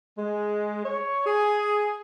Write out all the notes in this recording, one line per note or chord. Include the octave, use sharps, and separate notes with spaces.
G#3
C#5
G#4